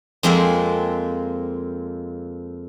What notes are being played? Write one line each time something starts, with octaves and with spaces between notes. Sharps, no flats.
F2 F3 G#3 A#3 C4